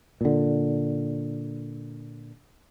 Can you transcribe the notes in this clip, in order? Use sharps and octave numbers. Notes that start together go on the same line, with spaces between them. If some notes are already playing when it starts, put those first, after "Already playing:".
A#2 D3